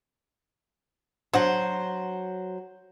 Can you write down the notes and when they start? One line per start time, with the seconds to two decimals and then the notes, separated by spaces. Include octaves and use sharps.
1.33 F#3 D4 F#4 C5 F#5